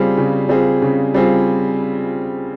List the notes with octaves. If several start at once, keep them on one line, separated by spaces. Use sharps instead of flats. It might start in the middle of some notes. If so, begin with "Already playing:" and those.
Already playing: C#3 G3 C4 F4 G#4
C#3
G3 C4 F4 G#4
C#3
G3 C4 F4 G#4